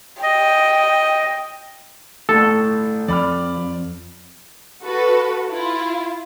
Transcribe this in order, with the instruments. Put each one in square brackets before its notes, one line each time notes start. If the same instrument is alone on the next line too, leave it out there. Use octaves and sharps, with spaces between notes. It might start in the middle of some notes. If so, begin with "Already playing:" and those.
[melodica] D#5 [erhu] G5
[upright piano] G1 A2 [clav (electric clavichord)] A4
[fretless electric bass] F2 [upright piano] D5 B5 F6
[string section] F#4 A4 B4
E4 F4